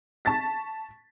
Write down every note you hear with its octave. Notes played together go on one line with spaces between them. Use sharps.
A5 C#6 A6 B6